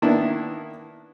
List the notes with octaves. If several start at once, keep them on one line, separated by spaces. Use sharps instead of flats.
D#3 A#3 B3 D4 E4